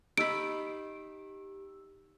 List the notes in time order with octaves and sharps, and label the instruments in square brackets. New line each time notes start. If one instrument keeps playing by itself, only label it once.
[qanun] D#4 B5 [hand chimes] G4 E6 [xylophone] D7